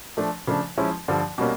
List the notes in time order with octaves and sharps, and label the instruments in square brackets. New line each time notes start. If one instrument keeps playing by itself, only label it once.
[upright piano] F3 A3 D4
C#3 F3 A3 D4
F3 G#3 C#4 E4
G2 D3 F3
B2 G3 A#3 C#4